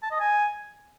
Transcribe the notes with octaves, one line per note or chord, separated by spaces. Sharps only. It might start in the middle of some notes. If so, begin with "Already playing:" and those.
A5
D#5
G#5